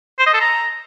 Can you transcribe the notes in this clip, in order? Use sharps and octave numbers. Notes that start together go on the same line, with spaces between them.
C5
D#5
A4
A#5